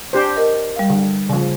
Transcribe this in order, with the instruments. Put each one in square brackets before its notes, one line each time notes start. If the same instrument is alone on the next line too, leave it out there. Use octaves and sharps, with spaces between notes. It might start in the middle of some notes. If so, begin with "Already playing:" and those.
[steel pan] D4 G4 C5
[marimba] A#4 D#5
G3 F5
[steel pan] D3
C#3 F3